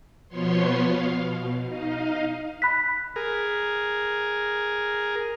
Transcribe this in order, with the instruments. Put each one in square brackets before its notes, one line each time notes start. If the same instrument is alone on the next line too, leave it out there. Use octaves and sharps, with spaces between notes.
[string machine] B2 F3 B3 C#5 C6
F5
B2
D#4 D#5 F5
[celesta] B5 F#6 B6
[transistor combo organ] G#4 A#4